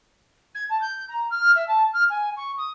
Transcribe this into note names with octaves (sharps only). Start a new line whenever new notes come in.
G#6
A5
G6
A#5
F6
E5
A5
F6
G#5
C#6
D#6